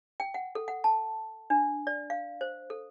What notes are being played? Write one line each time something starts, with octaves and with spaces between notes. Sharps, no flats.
G5
F#5
A4
F#5
A5
D4
D5
F5
C5
A4